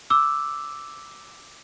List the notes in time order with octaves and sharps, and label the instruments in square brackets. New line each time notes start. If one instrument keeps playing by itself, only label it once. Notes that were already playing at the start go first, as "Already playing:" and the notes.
[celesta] D6 E6